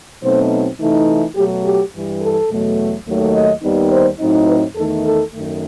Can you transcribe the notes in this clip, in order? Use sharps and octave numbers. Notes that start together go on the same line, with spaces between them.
B2 F#3 A3 C4 D#4 C5
C3 E3 A3 D#4
B2 F#3 A3 G4
G4
G2 E3 G3
A4
E2 B2 F#3 A3
D#2 D#3 F#3 A3
D#5
D#2 D#3 G3 B3 D#4
C5
A2 F#3 C4 D#4
B4
E2 D#3 A3 D#4 A4
A4
F#2 D#3 A3